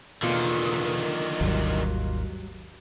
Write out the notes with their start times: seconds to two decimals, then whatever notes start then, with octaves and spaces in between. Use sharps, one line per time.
0.23 E2 B2 D3 D#3 A#3 F4
1.41 G#1 D#2 F#3 G3